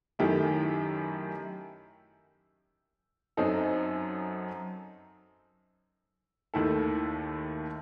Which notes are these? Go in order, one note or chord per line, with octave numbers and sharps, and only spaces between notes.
F#2 D#3 A3 E4 G4
F#2 F#3 C4 D#4 A4
D#2 D#3 A3 E4 A4